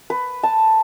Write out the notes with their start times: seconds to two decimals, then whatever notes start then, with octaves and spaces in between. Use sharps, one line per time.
0.10 B4
0.43 A5